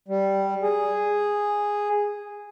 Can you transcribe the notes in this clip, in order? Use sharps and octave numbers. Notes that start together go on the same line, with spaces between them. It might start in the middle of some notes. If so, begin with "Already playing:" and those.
G3
G#4